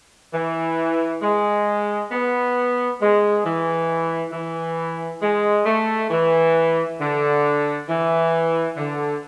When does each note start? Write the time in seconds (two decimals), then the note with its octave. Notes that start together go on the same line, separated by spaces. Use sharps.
0.33 E3
1.22 G#3
2.11 B3
3.00 G#3
3.45 E3
4.32 E3
5.21 G#3
5.66 A3
6.11 E3
7.00 D3
7.88 E3
8.76 D3